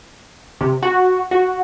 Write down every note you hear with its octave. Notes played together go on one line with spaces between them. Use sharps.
C3
F#4
F#4